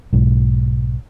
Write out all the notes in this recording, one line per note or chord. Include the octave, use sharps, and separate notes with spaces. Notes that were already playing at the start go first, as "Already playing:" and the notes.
B1 G#2